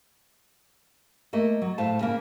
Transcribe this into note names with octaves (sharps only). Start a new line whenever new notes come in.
A3 A#3 D#5
F#3
A2 C5 F5 A5
C#3 A#3